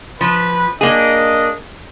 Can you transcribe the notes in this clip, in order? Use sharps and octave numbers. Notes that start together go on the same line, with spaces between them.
F3 B4
A#3 D4 G#4 D#5